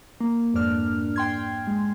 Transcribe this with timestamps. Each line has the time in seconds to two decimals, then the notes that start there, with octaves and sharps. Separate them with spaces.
0.21 A#3
0.54 F2 G#2 D4 F6
1.16 G5 C6 G#6
1.34 G5
1.67 G#3